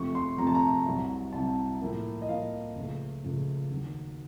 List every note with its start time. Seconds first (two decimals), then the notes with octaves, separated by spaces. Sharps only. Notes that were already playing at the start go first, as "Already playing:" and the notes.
Already playing: F2 C3 F3 A3 C#6
0.15 C6
0.38 F2 C3 F3 A3 A#5
0.47 A5
0.55 A#5
0.86 C2 C3 F#3
1.33 C2 C3 F#3 A5
1.81 A2 F3 A#3
2.22 D#5
2.29 A2 F3 A#3 F5
2.76 C#2 C#3 F3 A3
3.23 C#2 C#3 F3 A3
3.71 D#2 D#3 F#3